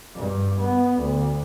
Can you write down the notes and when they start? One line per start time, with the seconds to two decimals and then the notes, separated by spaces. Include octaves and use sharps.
0.15 G2
0.61 B3
1.00 D2